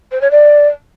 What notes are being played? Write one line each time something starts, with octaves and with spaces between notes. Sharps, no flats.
C5
C#5
D5